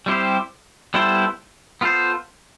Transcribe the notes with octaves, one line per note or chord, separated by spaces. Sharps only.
G3 C4 E4 G4 C5
G3 B3 E4 A4 C5
B3 F4 A4 C5